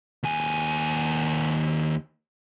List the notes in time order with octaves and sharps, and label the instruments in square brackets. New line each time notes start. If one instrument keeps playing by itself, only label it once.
[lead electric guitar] D#2 G#5